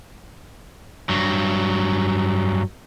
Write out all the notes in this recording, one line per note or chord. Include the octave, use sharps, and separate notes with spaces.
G2 F#3